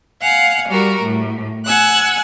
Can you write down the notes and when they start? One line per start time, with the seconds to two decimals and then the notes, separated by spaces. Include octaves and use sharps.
0.21 F5 F#5 G#5
0.70 G3 F#4 A#4
1.02 A2
1.65 F#5 G#5 E6 F#6